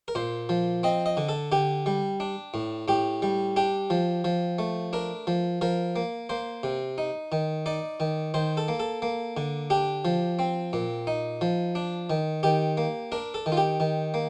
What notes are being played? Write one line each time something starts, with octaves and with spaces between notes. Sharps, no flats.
A#4
A#2 C5
F3
C4 D#5
D#5
D3
A4
D3 G4
G3
D4
A2
A2 G4
G3
D4 G4
F3
F3
A3
D4 A#4
F3
F3 A#4
A#3
A#3 C5
C3
D#4
D#3
D#4 D5
D#3
D#3 C5
A4
A#3
A4
A#3
D3
D4 G4
F3
C4
A#2
D#4
F3
D4
D#3
D#3 G4
A#3
D4 A#4
A4
D#3
F4
G4
D#3
A#3